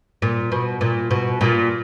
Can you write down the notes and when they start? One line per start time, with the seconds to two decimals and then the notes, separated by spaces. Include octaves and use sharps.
0.22 A#2
0.52 B2
0.81 A#2
1.11 B2
1.41 A#2